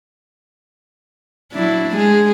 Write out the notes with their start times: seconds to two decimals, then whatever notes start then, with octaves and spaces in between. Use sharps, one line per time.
1.52 F#3 D4 E4
1.93 G#3 G#4